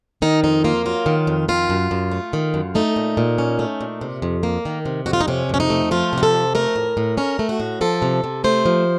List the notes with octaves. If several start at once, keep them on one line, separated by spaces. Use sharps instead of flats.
D#3 D#4
F2 D#4
A#3 F4
F#3 F4
D#3
F2
D#3 F4
F#2
F#2
A3
D#3
F#2
A3 D#4
A#2
A#2
C#4
A3
A#2
C3
F2
A#3
D#3
C3
F2 F#4
F4
D#4
C3 C#4
F2 C#4
D#4
A3
F3 F4
C3 F#4
A4
F2
A3 A#4
A2
A2
C#4 A#4
A3
F#4
A2
F3 A4
C3
C3
A3 C5
F3